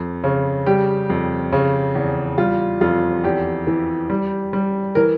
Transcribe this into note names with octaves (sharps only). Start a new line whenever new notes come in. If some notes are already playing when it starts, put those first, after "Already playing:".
Already playing: F2
C#3
G3 G4
F2
C#3
E2
G3 F4
F2 F4
E2 G4
E3
G3
G3
E3 A#4